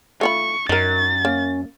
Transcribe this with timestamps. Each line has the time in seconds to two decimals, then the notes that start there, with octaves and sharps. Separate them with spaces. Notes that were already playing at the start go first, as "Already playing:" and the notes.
0.21 A3 F4 B5 C#6
0.69 F#2 D#4 A#4 A6
1.25 A#3 C#4